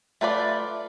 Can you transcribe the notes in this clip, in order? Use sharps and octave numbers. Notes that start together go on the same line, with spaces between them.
A3 F4 B4 D5